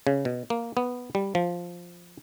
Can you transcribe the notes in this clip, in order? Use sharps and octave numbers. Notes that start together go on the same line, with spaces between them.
C#3
B2
A#3
B3
G3
F3